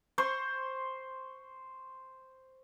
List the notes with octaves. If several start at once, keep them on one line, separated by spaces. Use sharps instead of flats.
C5 C6 C#6